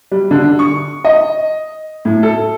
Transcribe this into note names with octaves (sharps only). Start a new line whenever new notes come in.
G3
D3
C#6
D#5
A2
A4